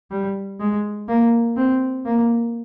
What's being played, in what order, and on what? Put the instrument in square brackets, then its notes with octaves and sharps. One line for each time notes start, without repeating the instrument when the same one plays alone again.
[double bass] G3
G#3
A#3
C4
A#3